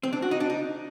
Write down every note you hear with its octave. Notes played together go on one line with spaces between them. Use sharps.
C4
D4
F#4
D#4
D4
D#4